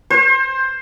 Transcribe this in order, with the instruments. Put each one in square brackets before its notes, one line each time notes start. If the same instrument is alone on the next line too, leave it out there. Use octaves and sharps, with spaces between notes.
[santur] C5